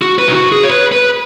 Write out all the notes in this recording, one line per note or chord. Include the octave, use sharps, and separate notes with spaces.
F#4
B4
D#4
F#4
G#4
C#5
B4
B4